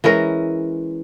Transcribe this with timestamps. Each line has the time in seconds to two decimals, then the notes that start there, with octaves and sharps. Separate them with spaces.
0.04 E3 G#3 C#4 A#4